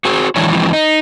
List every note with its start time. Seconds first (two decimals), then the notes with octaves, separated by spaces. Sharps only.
0.05 F#4 G#4 C5
0.36 D3 E3 G#3 D4 E4 C#5
0.51 E3 F3 G3 G#3 C4
0.73 D#4